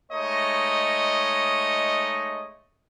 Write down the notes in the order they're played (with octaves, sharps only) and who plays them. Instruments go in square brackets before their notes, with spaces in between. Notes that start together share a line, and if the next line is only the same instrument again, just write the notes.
[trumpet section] G#3 A3 D#4 C#5 D#5